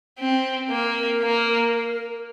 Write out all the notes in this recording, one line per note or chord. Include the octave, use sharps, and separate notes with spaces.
C4
A#3 A#4
A#3